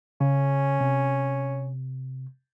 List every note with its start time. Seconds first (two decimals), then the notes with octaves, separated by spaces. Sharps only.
0.21 C#3 C#4
0.81 C3